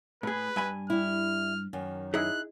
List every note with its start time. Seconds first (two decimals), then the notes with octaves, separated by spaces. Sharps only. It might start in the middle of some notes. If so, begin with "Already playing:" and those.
0.23 A2 G#4 B4
0.56 G2 G#5 B5
0.90 G3 E4 F6
1.73 F#2 D#3
2.14 D#4 E4 G#4 F#6